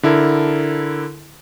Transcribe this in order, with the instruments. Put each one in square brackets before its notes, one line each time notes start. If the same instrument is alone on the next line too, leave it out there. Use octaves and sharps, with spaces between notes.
[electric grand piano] D3 E4 A4 A#4